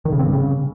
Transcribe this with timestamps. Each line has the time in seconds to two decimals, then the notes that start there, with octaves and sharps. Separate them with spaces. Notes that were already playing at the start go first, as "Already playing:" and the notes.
0.05 D#3
0.12 C#3
0.19 C4
0.26 G2
0.33 C#3